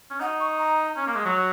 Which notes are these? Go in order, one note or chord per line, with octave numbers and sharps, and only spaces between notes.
C#4
D#4 F#5
C#6
A#5
C#4
A#3
G#3
F#3